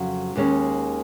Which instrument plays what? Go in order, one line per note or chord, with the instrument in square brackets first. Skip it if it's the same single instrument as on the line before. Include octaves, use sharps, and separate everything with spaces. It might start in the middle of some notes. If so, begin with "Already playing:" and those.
Already playing: [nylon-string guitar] F2 C#3 F#3
D#2 D#3 G#3 C#4